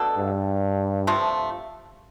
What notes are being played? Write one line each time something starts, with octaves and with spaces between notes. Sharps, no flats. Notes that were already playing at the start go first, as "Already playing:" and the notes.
Already playing: B2 A3 D4 A4
G2
C3 F3 A3